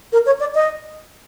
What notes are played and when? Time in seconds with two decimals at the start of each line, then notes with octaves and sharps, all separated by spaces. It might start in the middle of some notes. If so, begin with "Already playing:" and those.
0.13 A#4
0.26 C#5
0.40 D5
0.55 D#5